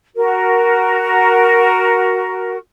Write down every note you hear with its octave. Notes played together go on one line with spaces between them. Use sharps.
F#4 A#4